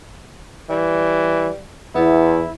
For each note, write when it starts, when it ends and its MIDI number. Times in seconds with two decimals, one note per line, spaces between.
0.70 1.50 52
0.70 1.59 55
1.95 2.46 40
1.95 2.50 59
1.95 2.52 64